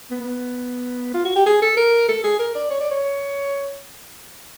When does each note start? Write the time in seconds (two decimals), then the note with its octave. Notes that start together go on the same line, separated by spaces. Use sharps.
0.10 B3
0.21 B3
1.14 F4
1.25 F#4
1.36 G4
1.46 G#4
1.62 A4
1.77 A#4
2.09 A4
2.24 G#4
2.39 A#4
2.55 D5
2.70 C#5
2.81 D5
2.91 C#5